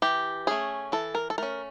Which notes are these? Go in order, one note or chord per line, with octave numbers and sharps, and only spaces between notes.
E3 G4
A3 C#4 G#4
E3 A4
A#4
A4
A3 C#4 A#4